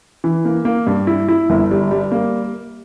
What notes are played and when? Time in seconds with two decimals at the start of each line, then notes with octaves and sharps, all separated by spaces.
0.24 E3
0.45 A#3
0.65 A#3
0.87 G2
1.07 E4
1.29 E4
1.50 G1
1.71 G3
1.91 G3
2.12 A#3